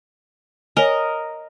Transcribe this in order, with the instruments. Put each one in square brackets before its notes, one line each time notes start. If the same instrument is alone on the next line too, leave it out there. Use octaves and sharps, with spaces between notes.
[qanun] A#4 D#5 [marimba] C#5 G#5